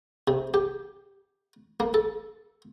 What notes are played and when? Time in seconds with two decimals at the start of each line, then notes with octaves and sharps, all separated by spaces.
0.28 C3
0.54 G4
1.80 A#3
1.94 A4